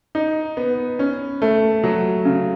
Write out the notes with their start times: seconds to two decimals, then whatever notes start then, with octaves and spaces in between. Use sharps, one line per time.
0.15 D#4
0.57 B3
0.99 C#4
1.42 A3
1.83 F#3
2.25 C#3